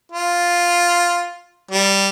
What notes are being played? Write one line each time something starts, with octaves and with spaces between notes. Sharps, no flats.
F4
G3